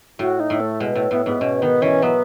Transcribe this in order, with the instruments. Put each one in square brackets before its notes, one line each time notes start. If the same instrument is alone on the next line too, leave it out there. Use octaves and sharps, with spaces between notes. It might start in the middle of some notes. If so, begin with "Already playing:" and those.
[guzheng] A2 [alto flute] F#4
[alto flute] D#4
[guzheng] A2
[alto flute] A3
[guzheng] B2 [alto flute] G#3
[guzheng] A2 [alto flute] A3
[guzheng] A2 [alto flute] B3
[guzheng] G#2 [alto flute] B3
[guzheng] B2 [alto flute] C#4
[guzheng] D#3 [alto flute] B3
[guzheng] E3 [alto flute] C#4
[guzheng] F#3 [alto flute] B3